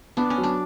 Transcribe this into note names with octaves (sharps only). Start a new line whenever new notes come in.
B3 D4
C#4
F#3
D4